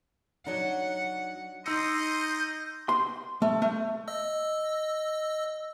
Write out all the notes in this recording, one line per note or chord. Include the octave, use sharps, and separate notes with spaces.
F#3 D4 D#4 F#5
D#4 D#5 C6 E6 G6 C#7
C6
A3
A3
D#5 E6